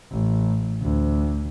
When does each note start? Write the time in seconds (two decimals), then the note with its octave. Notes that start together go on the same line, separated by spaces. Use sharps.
0.12 A1
0.81 D2